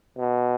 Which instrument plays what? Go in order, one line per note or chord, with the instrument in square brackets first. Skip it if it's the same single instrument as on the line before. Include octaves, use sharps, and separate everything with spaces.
[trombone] B2